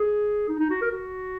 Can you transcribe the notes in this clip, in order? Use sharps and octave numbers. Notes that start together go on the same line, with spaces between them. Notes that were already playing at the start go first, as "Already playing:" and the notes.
Already playing: G#4
D#4
D#4
F#4
A#4
F#4